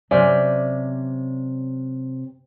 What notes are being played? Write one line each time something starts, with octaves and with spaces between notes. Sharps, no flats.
C3 F#3 C#4 C5 D5 E5